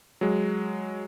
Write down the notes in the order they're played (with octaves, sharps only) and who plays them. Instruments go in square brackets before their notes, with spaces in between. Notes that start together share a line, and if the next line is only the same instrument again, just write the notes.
[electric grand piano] F#3 G#3